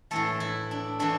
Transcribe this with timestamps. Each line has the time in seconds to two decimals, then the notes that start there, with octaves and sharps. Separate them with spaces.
0.11 A2 E3 A3 A4
0.40 E4
0.71 D4
0.99 A2 E3 A3 D4